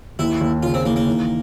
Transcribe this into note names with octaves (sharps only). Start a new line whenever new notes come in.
D#2 E4
D#2
C#3 F4
C4
E3 A#3
A#3
D#3